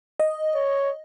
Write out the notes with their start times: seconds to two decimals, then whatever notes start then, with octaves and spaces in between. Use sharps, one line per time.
0.20 D#5
0.55 C#5